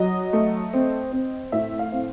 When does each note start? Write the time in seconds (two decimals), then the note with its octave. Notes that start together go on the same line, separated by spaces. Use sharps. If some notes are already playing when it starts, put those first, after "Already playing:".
Already playing: F#3 D#5
0.33 A3
0.73 C4
1.12 C4
1.52 A2 E5
1.79 F5
1.92 C4